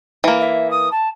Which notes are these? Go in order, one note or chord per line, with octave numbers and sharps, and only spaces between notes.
E3 A#3
E5
D#6
A5